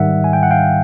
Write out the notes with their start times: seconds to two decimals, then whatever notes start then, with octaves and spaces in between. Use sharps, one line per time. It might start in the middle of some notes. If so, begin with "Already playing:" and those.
Already playing: G#2 D#3 G3 E5 F#5
0.24 G#5
0.33 G5
0.43 F#5
0.51 F5 G5